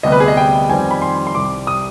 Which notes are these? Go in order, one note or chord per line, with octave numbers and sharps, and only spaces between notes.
D2 C3 G3 B3 D#5
B4
G#4
D#5
G5
F2 D#3 G3 C4 G#5
B5
C6
C6
C2 C3 G3 D6
D#6